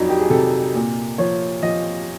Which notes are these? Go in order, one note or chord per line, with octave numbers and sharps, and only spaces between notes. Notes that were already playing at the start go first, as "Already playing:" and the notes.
Already playing: F2 F#3 D4 D#4
G4
G#4
C3 A4
A#2
F3 C#5
F3 D#5